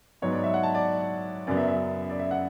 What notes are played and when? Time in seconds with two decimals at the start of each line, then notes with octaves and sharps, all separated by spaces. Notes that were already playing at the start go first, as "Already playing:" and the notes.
0.22 G#2 F#3 B3 C#5
0.32 D5
0.44 E5
0.54 F#5
0.63 A5
0.75 D5
1.47 F#2 C#3 F#3 B3 D5
1.57 E5
1.68 E5
2.10 D5
2.19 E5
2.31 F#5